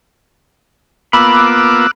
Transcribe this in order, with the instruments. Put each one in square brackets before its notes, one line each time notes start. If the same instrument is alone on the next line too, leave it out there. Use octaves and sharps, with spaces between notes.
[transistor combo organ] A#3 B3 F4 [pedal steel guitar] B5 [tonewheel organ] D6 E6 F#6